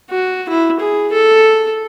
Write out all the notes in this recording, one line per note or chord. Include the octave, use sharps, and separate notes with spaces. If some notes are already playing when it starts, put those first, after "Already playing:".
F#4
E4
G#4
A4